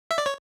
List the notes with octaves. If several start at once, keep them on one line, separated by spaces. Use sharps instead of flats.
E5
D5
C#5